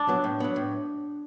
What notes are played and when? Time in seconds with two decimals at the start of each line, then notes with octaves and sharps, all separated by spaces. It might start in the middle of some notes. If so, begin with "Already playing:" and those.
Already playing: D4
0.09 F#3 B3
0.24 A2
0.40 F#3 B3
0.56 A2